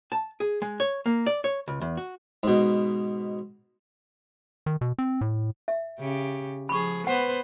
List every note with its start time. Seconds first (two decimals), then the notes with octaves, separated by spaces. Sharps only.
0.12 A5
0.40 G#4
0.62 G#3
0.80 C#5
1.06 A#3
1.26 D5
1.44 C#5
1.68 C#2
1.81 E2
1.97 F#4
2.43 G#2 B2
4.66 D#3
4.81 B2
4.99 C4
5.21 A2
5.68 E5
5.99 C#3 G4
6.69 F3 G#4 B5 C#6
7.07 B3 B4 C5 F#5